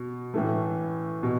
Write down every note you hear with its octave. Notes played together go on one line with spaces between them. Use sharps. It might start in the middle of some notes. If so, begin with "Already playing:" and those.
Already playing: B2
A2 E3 A3
B2